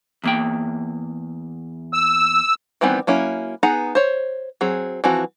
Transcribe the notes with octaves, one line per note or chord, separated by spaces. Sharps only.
E2 A#3 G5
E6
D#3 E3 G3 B3 C4
F#3 A#3 C#4 E4
B3 D#4 G#4 F#5 A#5
C5 C#5
F#3 C4 G#4
E3 F3 C4 F#4